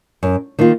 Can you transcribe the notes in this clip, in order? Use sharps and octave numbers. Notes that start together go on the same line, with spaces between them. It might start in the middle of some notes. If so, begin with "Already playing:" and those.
F#2
D#3 A#3 F4